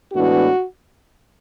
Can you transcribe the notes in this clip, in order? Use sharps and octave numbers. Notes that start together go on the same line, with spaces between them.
A2 E3 G#3 B3 D4 F#4